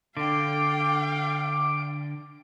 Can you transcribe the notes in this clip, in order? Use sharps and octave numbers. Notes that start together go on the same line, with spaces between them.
D3 F5 G5 D6